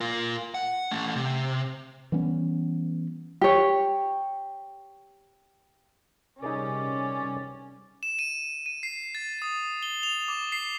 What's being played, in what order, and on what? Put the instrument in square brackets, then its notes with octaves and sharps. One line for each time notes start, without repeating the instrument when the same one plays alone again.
[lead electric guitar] F4 A#4
F#5
A3 C#4
C3
[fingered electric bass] E3 G3 B3 C#4
[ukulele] G4 C#5
[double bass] C3 G3 [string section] C#4 [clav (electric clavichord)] D#4 G#4 A#4 [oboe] D5
[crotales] E7
D#7
D#7
C7
A6
D#6
G7
F7
D6
C7